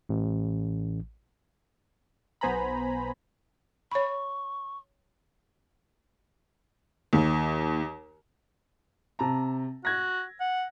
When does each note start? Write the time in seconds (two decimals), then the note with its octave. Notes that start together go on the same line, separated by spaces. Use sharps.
0.09 A1
2.41 B1 B3 C5 G#5 A#5 B5
3.91 C#5 B5 C#6
7.13 D#2
9.19 C3 A5 A#5
9.85 F#4 G#6 A#6
10.40 F#5